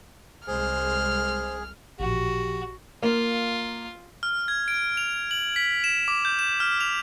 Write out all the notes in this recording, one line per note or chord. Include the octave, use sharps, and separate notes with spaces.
C2 G#3 G#4 C5 F6
A1 A#2 F3 F#4 G4
A#3 F4
F6
G#6
D7
F7
F#7
B6
E7
D6
G6
E7
F6
F7